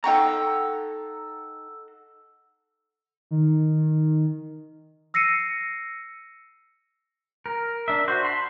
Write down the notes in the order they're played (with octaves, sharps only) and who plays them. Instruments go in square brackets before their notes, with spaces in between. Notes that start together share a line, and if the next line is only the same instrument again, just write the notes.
[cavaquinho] D#4 G5 C#6 [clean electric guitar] A4 F#5 A#5
[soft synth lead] D#3
[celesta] E6 A#6 C7 C#7 D#7
[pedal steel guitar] A#4
D4 E5
F#4 C5
A5 B5 C6